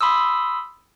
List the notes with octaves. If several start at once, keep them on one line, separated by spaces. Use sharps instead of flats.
B5 C6 D#6 E6